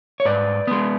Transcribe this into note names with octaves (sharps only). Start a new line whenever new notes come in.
C#5
G#2 B4 D5
G#3 B3